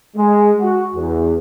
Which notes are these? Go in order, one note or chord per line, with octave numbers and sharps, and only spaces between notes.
G#3
F#4
E2